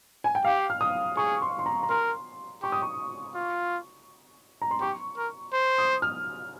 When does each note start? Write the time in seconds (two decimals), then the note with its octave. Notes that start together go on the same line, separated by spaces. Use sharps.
0.24 G#5
0.35 G5
0.45 G4 F5
0.70 F6
0.81 D#6
1.17 G#4 C#6
1.42 C6
1.59 C6
1.66 A#5
1.83 A#5
1.90 A#4 C6
2.62 G4 C#6
2.72 D#6
2.82 C#6
3.35 F4
4.62 A#5
4.71 C6
4.81 G4 C#6
5.17 A#4
5.53 C5
5.78 D#6
6.02 F6